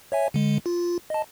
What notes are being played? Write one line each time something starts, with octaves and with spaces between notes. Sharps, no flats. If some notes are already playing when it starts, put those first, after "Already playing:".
C#5 E5 G#5
D3 G#3
F4
D#5 A5